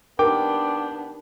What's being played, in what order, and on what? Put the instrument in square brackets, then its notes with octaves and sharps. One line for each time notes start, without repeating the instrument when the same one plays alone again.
[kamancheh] B3 D4 [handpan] D#4 G4 A#4 [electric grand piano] G5 D6